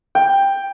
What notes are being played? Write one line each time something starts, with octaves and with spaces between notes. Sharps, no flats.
G5